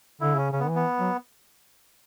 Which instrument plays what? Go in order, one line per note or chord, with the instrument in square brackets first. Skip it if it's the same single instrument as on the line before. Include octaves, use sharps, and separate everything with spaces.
[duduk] D3 [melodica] E4
[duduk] C#3 [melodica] C#4
[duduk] C#3 [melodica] C#4
[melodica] B3
[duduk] E3
[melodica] B3
[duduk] F#3